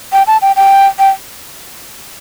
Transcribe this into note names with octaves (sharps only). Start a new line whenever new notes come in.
G5
A5
G5
G5
G5